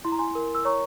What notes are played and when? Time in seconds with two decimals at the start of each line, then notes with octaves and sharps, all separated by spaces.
0.05 E4 C6
0.12 A#5
0.19 G#5 C6
0.35 A#4
0.55 E6
0.65 C#5 A#5 C#6